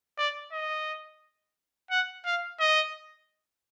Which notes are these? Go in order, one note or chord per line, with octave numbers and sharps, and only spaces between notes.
D5
D#5
F#5
F5
D#5